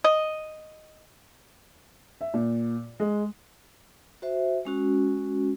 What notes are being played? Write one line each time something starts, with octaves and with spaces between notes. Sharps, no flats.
D#5
E5
A#2
G#3
F#4 C5 E5
G#3 C#4 F#4